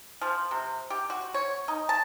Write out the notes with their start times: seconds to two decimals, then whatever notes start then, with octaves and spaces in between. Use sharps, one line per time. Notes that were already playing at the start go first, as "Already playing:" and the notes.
0.21 F3
0.51 C3
0.90 G4
1.10 F#4
1.34 C#5
1.68 D#4
1.89 A5